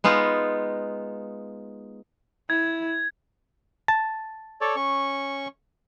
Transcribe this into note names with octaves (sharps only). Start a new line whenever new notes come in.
G#3 B3 D#4 F4
E4 G#6
A5
A4 C#5 D5
C#4 C#6